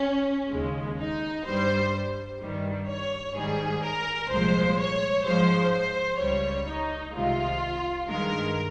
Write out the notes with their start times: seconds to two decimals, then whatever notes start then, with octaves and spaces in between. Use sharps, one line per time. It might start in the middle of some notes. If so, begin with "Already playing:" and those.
Already playing: C#4
0.51 D#2 C#3 G#3
0.99 D#4
1.46 G2 G3 C5
2.40 G2 D#3 G3
2.88 C#5
3.35 G#2 D#3 G3 G#4
3.83 A#4
4.30 C2 A#2 F3 G#3 C5
4.78 C#5
5.25 G#2 F3 G#3 C5
5.72 C5
6.19 C#2 C#3 G3 C#5
6.66 D#4
7.14 C2 C3 D#3 G#3 F4
8.09 G2 D#3 G#3 A#4